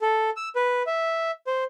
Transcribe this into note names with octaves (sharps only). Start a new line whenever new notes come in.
A4
E6
B4
E5
C5